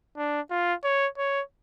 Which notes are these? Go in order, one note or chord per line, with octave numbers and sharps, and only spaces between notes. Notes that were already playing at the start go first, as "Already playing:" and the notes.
D4
F4
C#5
C#5